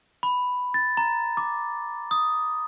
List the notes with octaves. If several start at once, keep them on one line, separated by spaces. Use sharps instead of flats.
B5
A6
A#5
D6
D#6